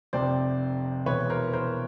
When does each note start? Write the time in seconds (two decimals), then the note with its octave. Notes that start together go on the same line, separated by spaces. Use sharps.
0.13 F1 F2 C3 C5 D5
1.06 E1 E2 B2 B4 C#5
1.30 A#4 C5
1.53 A#4 C5